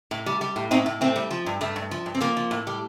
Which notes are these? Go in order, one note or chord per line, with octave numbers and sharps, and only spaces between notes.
A2
G3
G3
A2
A2 C4 D#4
A2
A2 A3 C4
G3
F3
G2
G2 A3
G2
F3
G2
C4
F3 A#3
F3
A2
G3